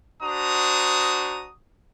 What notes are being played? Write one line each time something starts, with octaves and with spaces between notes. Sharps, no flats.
D4 F#4 C5 A#5 D#6